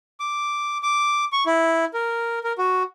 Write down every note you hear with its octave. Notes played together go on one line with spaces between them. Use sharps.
D6
D6
C#6
E4
A#4
A#4
F#4